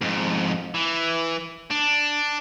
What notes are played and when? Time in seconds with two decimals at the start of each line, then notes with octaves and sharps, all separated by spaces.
0.01 F2 G#2
0.75 E3
1.71 D4